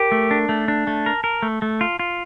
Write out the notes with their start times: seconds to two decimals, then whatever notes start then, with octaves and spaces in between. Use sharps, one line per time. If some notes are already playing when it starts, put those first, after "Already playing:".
Already playing: G4 A#4
0.12 A3
0.31 D4
0.49 A3
0.68 D4
0.87 A3 A5
1.06 A#4
1.24 A#4
1.42 A3
1.62 A3
1.81 F4
1.99 F4